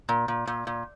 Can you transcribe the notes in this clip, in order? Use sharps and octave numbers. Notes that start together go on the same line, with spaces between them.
A#2
A#2
A#2
A#2